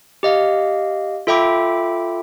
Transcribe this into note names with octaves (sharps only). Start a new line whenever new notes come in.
G4 D#5 F5
F4 A4 E5 G5 B5 D6